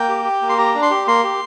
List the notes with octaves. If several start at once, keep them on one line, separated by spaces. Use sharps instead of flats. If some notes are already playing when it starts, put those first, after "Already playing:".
Already playing: A#3 G5
G4
G4
A#3
C6
G4 A#5
D4
C6
G4
A#3 C6
G4